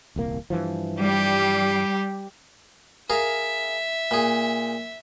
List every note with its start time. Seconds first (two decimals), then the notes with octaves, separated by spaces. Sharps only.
0.16 D#1 C2 A#3
0.50 G2 E3 F3
1.01 G3 G4
3.10 G#4 A#4 E5 F5
4.11 A#2 G#4